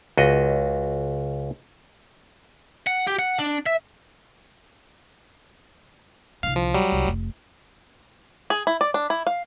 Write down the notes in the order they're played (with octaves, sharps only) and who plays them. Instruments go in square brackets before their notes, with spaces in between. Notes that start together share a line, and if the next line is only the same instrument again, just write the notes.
[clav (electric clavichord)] C#2 F#4 D#5
[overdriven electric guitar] F#5
G4
F#5
D4
E5
[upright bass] C2 D3 [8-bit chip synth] F5
[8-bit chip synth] F3
F#3 G3
[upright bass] C2
F1
[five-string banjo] G#4
E4
D5
D4
E4
F5